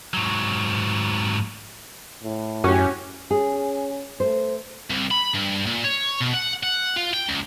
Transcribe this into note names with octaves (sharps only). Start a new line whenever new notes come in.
G#2 F#3
A2
F#2 C#4 F#4 G4
C#4 G#4
A3 C5
C2
B5
G2
A#2
C#5
B2
F#5
F#5
F4
G5
C#2